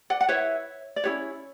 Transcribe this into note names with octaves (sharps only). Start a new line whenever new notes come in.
D5 F#5
F#5
E4 B4 C#5 E5
D5
C#4 E4 G4 B4 C#5